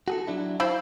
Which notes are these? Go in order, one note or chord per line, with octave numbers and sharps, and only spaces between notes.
F#4 G#4 A4
F#3 D4 E4
E4 C5 F5 B5